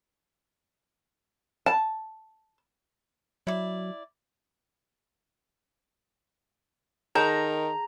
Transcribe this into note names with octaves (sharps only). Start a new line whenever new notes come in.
A5
F#3 E4 D5
D#3 G#4 A5 A#5 G6